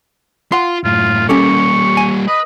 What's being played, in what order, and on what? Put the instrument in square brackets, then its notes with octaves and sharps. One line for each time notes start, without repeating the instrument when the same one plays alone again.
[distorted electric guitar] F4 [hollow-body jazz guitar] F#5 C6
[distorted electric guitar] F#2 A2 [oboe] F4
[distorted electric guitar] G3 A#3 [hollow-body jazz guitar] C#4 G4 A4 [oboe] C#6
[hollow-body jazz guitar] G#5
[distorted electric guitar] B4 [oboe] D#5